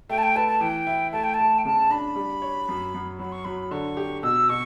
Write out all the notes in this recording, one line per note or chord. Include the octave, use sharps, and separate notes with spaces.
A3 G5
A5
G5
B4 A5
A5
E3 G5
E4
A3 A5
G5
A5
A3
G5
C#3 A5
D4 B5
G3
C#5
F#2
F#2
F#3 B5
C#6
F#3 B5
D3 C#6
G4
B2 E6
B2 C#6